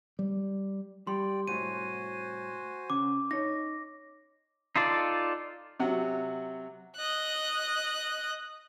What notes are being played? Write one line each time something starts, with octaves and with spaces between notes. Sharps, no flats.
G3
G3 D5 G5 C6
C2 A2 F#4 C5 G#5 D#7
C#3 D6
D#4 C#5 A#6
D#4 F4 A4 D5
C3 F#3 F#5
D#5 F#6